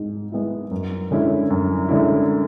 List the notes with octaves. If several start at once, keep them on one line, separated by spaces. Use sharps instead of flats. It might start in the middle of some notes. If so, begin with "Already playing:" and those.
Already playing: G#2 G#3
G#3 B3 E4
F#2
D3 G#3 C#4 E4
F#2
D3 G#3 C#4 E4